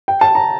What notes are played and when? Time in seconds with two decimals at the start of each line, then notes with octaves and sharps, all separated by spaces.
0.08 G5
0.21 A5
0.35 A#5